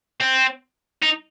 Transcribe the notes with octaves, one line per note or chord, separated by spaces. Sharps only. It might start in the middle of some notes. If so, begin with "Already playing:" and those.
C4
D#4